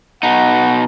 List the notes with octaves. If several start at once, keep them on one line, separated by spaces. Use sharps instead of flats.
B2 D#4 F#5